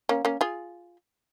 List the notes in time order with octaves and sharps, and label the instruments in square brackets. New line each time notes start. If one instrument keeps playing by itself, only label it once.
[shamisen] A#3 C#4
A#3 C#4
F4 G#4